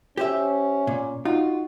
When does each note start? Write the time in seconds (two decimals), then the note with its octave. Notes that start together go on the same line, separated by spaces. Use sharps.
0.17 C#4 G4 C5 E5
0.87 A#2
1.25 D#4 F4 F#4